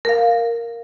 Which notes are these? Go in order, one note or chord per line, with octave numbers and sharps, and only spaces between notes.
A#4 F5